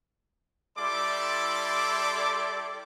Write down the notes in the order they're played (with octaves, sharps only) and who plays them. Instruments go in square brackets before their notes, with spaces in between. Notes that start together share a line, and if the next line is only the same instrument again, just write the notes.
[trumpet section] G3 E4 A4 D5 C6 D6